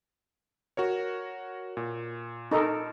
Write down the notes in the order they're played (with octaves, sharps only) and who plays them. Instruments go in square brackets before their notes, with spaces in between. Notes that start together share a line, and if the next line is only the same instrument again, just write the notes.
[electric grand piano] F#4 A#4 C#5
A#2
[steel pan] D#4 A4 A#4